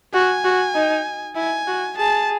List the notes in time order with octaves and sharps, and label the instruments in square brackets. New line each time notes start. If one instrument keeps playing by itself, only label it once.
[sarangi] F#4 [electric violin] G#5
[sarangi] F#4
D#4
[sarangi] E4 [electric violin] G#5
[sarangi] F#4
[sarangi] G#4 [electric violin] A5